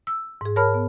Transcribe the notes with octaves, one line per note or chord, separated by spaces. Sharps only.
E6
G#2 G#4
A#4 C#5 A5 B5 F6
B3